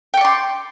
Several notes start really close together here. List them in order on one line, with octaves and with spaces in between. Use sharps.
G5 C#6 D5 C6